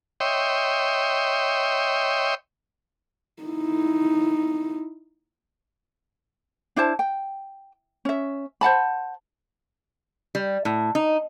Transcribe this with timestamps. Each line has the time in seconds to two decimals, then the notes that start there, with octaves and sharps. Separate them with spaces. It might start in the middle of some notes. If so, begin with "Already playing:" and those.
0.20 C#5 D#5 E5 G5 C6
3.42 D#4 E4
6.76 D4 E4 C5 A5
6.99 G5
8.05 C#4 E5
8.61 C5 F#5 A5 B5
10.35 G3
10.65 A2
10.95 D#4